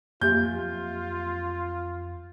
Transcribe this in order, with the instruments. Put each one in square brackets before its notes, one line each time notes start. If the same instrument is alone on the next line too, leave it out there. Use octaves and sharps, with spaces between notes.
[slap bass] F2 F#3 [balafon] A#3 G4 E5 [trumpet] F4 [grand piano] G6